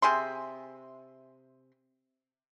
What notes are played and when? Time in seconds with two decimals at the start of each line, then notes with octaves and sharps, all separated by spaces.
0.02 C3 G#4 E5 C6